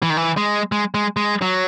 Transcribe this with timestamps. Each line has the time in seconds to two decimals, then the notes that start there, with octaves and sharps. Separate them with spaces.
0.02 E3
0.10 D#3
0.17 E3
0.37 G#3
0.72 G#3
0.94 G#3
1.17 G#3
1.42 F#3